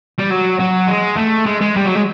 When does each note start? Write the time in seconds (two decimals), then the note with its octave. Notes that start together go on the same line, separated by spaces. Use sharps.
0.18 G3
0.30 F#3
0.59 F#3
0.88 G#3
1.18 A3
1.46 G#3
1.61 G#3
1.76 G3
1.85 F#3
1.95 G#3